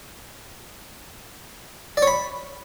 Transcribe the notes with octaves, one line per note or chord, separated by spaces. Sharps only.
D5
C#5
B5